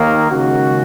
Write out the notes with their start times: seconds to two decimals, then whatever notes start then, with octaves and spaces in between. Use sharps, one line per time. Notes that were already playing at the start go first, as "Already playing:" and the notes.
Already playing: D#2 D#3 A#3
0.30 D#2 C#3 G#3 C#4 F#4